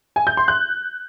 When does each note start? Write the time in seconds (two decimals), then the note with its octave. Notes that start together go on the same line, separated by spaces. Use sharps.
0.16 G#5
0.27 G6
0.37 C6
0.48 F#6